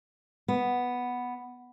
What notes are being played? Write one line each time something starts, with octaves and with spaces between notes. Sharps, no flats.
B3